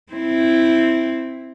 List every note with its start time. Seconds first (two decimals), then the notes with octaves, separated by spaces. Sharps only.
0.12 C4 E4